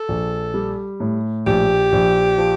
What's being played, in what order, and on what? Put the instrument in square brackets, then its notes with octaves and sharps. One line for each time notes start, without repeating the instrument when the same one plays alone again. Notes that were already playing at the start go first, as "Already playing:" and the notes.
Already playing: [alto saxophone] A4
[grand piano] A#1
G3
A2
[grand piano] A#1 [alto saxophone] G4
[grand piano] A#1
F3